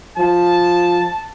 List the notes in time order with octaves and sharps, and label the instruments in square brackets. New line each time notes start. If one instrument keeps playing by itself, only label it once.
[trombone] F3 [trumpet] A5